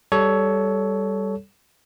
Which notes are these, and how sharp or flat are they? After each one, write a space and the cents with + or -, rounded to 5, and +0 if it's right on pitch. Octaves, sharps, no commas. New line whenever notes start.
G3 +0 A4 -10 C#5 +15